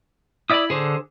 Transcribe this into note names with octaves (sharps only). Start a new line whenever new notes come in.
E4 D5 E5 B5 D#6
D3 G#4 C5